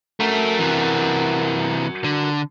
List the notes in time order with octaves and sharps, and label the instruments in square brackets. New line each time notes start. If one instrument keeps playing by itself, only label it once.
[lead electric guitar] A3 [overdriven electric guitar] F#4 A#4
[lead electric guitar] C3 E3
D3